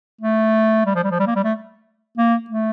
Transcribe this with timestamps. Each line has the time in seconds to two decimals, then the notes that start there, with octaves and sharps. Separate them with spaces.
0.21 A3
0.86 G3
0.95 F3
1.04 G3
1.11 F3
1.20 G3
1.27 A#3
1.36 G3
1.44 A3
2.18 A#3
2.50 A3